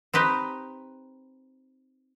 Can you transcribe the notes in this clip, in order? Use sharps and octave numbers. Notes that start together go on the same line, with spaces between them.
C4 D#4 G4 B4